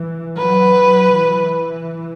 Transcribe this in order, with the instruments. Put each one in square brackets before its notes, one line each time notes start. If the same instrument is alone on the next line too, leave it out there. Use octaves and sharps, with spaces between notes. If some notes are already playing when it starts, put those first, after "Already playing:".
Already playing: [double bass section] E3
[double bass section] F#3 [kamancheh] B4
[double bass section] E3